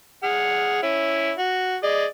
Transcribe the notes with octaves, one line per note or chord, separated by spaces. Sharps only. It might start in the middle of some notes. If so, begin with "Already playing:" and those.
G#4 F#5 F6
C#4 E4
F#4
G#4 D5 D#5